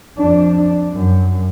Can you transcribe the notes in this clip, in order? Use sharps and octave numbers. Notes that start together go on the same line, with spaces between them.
F2 D4
F#2